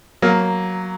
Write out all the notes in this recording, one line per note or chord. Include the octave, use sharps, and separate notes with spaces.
F#3 A#3